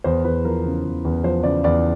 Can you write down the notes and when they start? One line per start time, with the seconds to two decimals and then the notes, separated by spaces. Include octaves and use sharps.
0.04 E2 C5
0.24 E2 B4
0.45 F3 A#4
0.65 C#3
0.85 E2
1.05 E2
1.24 F3 C5
1.43 C#3 D5
1.64 E2 D5